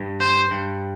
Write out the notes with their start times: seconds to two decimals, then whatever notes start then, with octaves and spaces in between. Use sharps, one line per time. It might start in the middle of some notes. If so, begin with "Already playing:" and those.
Already playing: G2
0.20 C5
0.51 G2